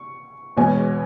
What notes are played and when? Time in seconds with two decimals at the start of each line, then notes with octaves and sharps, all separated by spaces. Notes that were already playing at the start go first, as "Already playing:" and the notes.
Already playing: C#6
0.57 E1 E2 B2 G#3 C#4 G#5